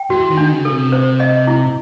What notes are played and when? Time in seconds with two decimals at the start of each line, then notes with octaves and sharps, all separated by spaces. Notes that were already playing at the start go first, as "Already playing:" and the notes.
Already playing: G5
0.10 E3 F#4
0.30 D#3
0.37 D4
0.51 C#3
0.65 A4
0.71 C3
0.92 C5
1.20 D#5
1.47 E4